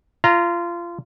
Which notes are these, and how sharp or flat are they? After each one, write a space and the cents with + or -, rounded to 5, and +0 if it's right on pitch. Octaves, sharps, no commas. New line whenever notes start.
F4 -25 A#5 +0